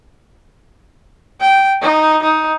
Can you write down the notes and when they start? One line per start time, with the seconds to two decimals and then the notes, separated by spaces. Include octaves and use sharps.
1.41 G5
1.82 D#4
2.23 D#4